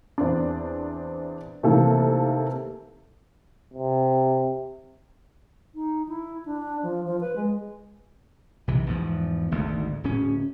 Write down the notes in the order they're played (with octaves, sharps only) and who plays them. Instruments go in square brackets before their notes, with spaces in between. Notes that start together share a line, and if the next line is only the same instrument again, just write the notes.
[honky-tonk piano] E2 C4 D4
C3 D#3 E3 A3 A#3 A4
[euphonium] C3
[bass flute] D#4
E4
D4
F3
F3
B4
G#3
[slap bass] B1 C3 E3
E2 G#2 F3
G#1 D2 G#2
D1 C#4